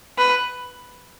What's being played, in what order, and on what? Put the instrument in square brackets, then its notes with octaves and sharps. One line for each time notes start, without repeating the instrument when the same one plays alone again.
[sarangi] B4